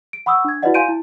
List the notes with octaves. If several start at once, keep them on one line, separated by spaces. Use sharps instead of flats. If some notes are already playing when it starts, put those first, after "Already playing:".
D7
F#5 B5 C#6 D#6 E6
D4 G#6
E4 F#4 B4 D5 D#5 F#5
F5 G#5 C6 G6 D7 D#7
E4